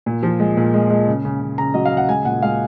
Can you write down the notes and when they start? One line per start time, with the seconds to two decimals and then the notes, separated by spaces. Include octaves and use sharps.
0.06 A#2
0.23 F3
0.40 G#3
0.57 A#2
0.74 G#3
0.90 G#3
1.07 C#3
1.25 C#3
1.42 C#3
1.58 C#3 A#5
1.74 F#3 D#5
1.86 F5
1.92 C#3
1.97 F#5
2.08 G#3 G#5
2.25 A#2 F#5
2.43 G#3 F5